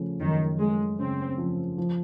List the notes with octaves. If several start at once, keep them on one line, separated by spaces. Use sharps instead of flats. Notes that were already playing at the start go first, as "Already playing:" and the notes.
Already playing: C#3 F3 A3
F#2 D#3
G#3 A3
C#3 C4
F3
F3